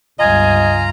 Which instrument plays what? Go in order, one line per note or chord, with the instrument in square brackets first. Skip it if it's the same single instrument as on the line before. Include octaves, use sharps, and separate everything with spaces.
[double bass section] G1 C#2 G2 [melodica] F4 A#5 [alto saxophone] D#5 [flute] G#5